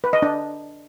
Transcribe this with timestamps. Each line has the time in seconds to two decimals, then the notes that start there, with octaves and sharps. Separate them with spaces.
0.04 B4
0.13 D#5
0.22 D4